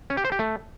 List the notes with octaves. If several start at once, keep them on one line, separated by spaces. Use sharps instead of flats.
C#4
G4
C5
G4
A3